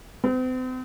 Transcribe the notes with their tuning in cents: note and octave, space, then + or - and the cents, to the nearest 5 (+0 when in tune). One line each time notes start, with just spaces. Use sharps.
C4 -40